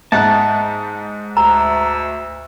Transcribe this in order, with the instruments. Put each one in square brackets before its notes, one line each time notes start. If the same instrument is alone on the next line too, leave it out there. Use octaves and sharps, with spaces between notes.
[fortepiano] G#2 D#4 F#5 [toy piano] E5 [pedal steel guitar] A5
[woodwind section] D2 E6 [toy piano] A#5